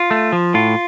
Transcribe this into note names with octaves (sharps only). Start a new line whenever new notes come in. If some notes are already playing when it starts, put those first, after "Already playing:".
Already playing: F4
A3
F3
A2 F4